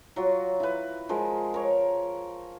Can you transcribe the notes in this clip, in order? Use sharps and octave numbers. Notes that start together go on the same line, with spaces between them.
F#3 F4 F#4
E4 B4
F3 G#3 A#4
A#4 C#5